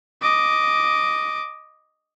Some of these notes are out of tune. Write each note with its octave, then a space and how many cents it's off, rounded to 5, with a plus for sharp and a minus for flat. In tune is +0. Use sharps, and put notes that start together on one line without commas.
D#5 +0 D6 +0